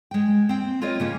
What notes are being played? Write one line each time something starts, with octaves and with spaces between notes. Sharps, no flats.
G#3 G5
C4 G5
F4 A#4 C#5 D#5
C#3 A#3 C#4